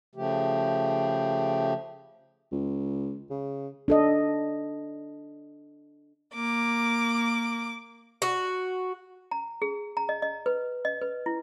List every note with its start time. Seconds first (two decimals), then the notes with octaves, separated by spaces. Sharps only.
0.15 C#3 F3 A3 G4
2.52 C#2
3.30 C#3
3.88 D4 A4 D#5
6.34 A#3 D6
8.22 F#4
9.31 A#5
9.62 G#4
9.97 A#5
10.09 D#5
10.22 D#5
10.46 B4
10.85 D#5
11.01 B4
11.26 E4